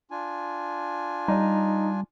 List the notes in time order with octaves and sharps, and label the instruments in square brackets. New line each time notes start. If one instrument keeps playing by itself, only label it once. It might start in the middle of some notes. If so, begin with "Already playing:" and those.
[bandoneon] D4 F4 G#5
[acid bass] G3 [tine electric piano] D#4